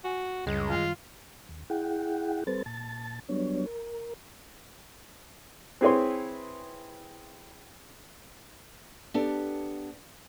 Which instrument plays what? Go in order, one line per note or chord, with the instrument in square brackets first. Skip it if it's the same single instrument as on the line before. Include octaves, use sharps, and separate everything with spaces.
[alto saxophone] F#4 [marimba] G#5
[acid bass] C#2 [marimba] F#2 G3 [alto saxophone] G#3
[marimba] D#3 [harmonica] F4
[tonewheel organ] D#2
E4 G#4 F#5 G5
G3 C4 A4 B4 C5 A6
A#2 A5 A6
F#3 G3 B3 D4 C#5
A#4
[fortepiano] C4 E4 G#4 B4 C#5 C6
[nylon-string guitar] B3 D4 G4 A4